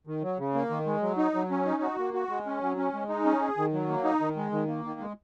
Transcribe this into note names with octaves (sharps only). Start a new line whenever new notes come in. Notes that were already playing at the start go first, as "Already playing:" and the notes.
D#3
F#3
C#3
A#3
D#3
G#3
F#3
D#4
F#3
C#4
D#4
F#4
A#3
F#4
G#3
C#4
F#3
C#4
G#3
D#4
C#4
G#4
D#3
F#3
A#3
D#4
D#3
G#3
D#3
A#3
D#3
G#3